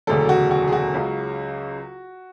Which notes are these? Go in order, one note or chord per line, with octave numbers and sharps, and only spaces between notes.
E1 D2 C#3 F#3 A4
F#4
F#4
G#4
F#4
C#2 C#3 F#3